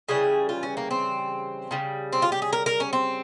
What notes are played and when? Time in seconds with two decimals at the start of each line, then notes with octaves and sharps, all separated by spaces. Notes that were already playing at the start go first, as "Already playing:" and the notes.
0.08 C#3 E3 G3 G#4
0.49 F4
0.63 C#4
0.77 A#3
0.91 C4
1.71 C#3 G3
2.13 C4
2.22 F4
2.32 G4
2.42 G#4
2.53 A#4
2.66 A#4
2.80 C#4
2.93 C4